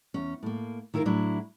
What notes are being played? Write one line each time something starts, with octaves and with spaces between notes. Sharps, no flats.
E2 C#4
A2 A#3
D#3 E4 F4 A4 A#4
A2 F#3 D4 E4